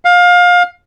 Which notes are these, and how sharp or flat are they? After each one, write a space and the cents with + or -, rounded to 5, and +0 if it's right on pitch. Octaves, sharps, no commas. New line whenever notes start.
F5 +25